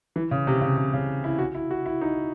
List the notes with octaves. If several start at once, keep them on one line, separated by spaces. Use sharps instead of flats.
E3
C#3
C3
C#3
C3
C#3
E4
F#4
E4
F#4
E4
D#4